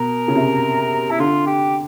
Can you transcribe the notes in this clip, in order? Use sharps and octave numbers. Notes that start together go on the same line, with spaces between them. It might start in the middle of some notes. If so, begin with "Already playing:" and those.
Already playing: B2 A#4
C#3
C3
E4
D3 F4
G4